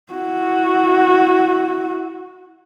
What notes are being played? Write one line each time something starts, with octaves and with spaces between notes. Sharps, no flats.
E4 F#4